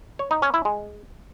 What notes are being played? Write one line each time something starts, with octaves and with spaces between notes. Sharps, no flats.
C#5
D#4
C#4
E4
G#3